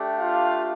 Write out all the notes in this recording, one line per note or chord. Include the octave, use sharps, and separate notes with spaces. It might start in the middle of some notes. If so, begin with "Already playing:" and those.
Already playing: A3 D4 G4
F4 F5